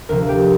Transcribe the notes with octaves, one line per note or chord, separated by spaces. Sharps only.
D2 C3 F3 A#4
G4